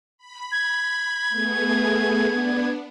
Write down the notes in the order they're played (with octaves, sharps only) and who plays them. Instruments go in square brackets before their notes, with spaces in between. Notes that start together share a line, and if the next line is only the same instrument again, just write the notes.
[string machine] B5
[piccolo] G#6
[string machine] A3 B3 G#4
B3 D4